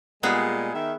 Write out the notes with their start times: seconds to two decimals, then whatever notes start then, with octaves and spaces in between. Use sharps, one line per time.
0.23 A#2 G3 G#3 B3 G#4
0.74 D#3 E5